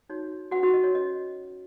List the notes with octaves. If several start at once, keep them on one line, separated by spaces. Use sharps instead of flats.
D#4 F#4 C#5
C#4 F#4 B4 F#5
F#4 F#5
D#5
C#5
C#4 F#4 B4 D#5